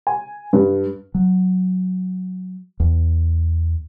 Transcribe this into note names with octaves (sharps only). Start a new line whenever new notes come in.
G#5
G2
F#3
E2